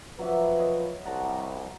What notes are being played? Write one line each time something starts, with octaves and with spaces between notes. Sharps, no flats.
F3 F#3 B4 E5 D6
C#5 D#5
C2 F#5 A5 A#5